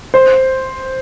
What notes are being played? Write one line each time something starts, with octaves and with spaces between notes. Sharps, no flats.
C5